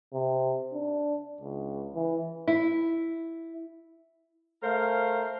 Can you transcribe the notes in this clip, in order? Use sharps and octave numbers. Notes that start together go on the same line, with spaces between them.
C3
D4
C#2
E3
E4
A3 A#4 C5 F5